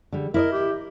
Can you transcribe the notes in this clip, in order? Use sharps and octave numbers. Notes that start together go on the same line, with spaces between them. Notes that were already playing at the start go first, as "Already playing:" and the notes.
D3 G3
E4 A#4 D5 D#5
G4